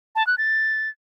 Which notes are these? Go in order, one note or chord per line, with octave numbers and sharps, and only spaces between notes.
A5
F#6
A6